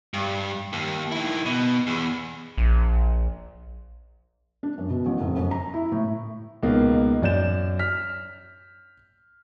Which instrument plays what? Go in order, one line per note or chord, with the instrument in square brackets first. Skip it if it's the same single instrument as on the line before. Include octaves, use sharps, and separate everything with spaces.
[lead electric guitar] G2
D#2
D#3 E4
B2
E2
[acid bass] A#1
[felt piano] D4
F#2
B2
A1
F1
F#2
A#5
E4
A2
[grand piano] C#2 B2 A#3 B3 D#4
F#2 D5 G6 E7
F6 B6